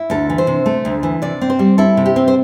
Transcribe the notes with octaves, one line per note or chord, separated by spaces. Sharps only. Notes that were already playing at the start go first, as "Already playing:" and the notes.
Already playing: E4
D2 A4
E3
C5
C3
A3
D2
E3
C3 D5
C4
C5
G3
E4 A4
C3
G4
C4
C5